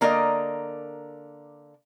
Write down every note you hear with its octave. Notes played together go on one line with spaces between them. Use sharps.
D3 A#3 A#4 D5 D#5